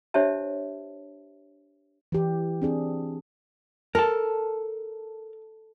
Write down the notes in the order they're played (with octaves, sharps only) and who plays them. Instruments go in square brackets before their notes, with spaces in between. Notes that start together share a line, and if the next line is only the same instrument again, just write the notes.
[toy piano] D4 G4 C5 C#5 E5 A5
[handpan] E3 G4
C4 D4 G#4
[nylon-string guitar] A4 [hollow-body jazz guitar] A#4 A5